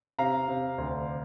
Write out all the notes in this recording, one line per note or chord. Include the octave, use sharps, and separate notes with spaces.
C3 F5 A#5
C3
D2